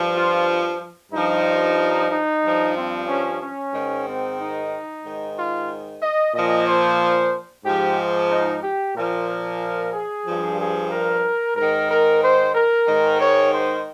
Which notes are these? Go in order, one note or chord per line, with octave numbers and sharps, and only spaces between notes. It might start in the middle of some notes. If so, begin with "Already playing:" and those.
Already playing: G2 F3
F4
G2 F3 D#4
D#4
G2 F3
C4
C#4
C#4
G#2 D#3
C4
D#4
G#2 D#3
F4
D#5
A#2 F3 D#5
C5
G#2 F3 G4
D#4
G4
A#2 F3 A#4
A#4
G#4
G2 F3
G#4
A#4
G#2 D#3 A#4
A#4
C5
A#4
G#2 D#3
C#5
C5